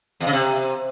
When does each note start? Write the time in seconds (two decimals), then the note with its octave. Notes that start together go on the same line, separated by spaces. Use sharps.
0.20 E2
0.27 C#3
0.33 C3